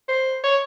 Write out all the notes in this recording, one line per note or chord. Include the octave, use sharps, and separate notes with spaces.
C5
C#5